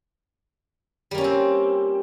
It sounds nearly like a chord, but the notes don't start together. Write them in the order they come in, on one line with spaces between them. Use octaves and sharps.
G3 A#3 C#4 F4 C4